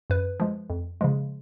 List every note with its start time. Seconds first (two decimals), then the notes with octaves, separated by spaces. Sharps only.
0.10 F#2 B4
0.40 F3 G#3
0.70 F2
1.01 C#3 F3 G#3